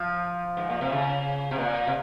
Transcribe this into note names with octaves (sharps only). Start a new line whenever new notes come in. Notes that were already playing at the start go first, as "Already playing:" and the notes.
Already playing: F3
G#2
A#2
C3
C#3
C3
A#2
C3